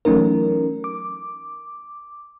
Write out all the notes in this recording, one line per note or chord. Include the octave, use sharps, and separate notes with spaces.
E3 F#3 A3 C#4 D#4 A#4
D6